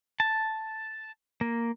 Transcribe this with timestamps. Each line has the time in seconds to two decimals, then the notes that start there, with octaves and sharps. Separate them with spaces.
0.20 A5
1.41 A#3